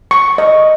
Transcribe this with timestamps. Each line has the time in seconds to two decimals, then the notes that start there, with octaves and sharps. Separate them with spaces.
0.11 C#6
0.38 D#5